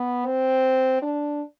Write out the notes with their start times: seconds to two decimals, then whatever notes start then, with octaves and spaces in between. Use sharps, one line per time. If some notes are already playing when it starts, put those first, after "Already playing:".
Already playing: B3
0.26 C4
1.02 D4